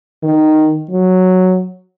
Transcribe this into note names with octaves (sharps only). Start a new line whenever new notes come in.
D#3
F#3